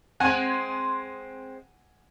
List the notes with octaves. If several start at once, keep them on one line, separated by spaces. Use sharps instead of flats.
G#3 C4 F#5 G#5